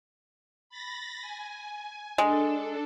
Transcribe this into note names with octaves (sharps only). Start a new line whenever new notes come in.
B5 A6 A#6
G#5
G#3 D4 A4